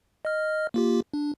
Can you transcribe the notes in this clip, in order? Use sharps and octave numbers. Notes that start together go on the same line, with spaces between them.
D#5 F6
A#3 F4 G4
D4